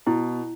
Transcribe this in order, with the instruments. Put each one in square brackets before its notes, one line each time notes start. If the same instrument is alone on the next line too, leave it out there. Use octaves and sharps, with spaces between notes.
[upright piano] B2 [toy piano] E4